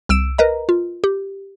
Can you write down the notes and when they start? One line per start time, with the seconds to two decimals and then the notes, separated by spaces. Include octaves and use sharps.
0.09 C2 E6 D7 E7
0.38 A#4 B4 D#5 A#5
0.69 F4
1.04 G4